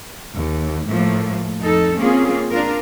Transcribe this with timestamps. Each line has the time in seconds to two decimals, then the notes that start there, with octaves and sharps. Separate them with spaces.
0.35 D#2
0.87 A2 F3 A3 A#3
1.60 F2 D#4 A4
1.96 A#3 C4 C#4 F4 G#4
2.50 D4 F4 A#4